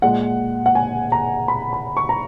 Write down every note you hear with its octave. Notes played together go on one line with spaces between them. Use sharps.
A#2 G#3 F#5
F#5
G#5
A#5
B5
B5
C#6
A#5